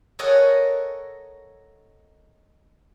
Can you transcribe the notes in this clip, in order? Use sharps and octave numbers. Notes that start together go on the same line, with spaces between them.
A4 A#4 C#5 D#5 F#5 G#5